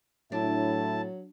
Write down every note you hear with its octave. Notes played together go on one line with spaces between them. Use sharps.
A2 F#3 D4 E4 A5